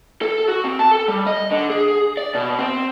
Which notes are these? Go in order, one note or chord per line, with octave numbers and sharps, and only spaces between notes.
A4
F#4
C4
A5
A4
G3
D#5
D3
G#4
D5
B2
C4